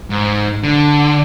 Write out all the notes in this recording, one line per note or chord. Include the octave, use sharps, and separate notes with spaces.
G#2
D3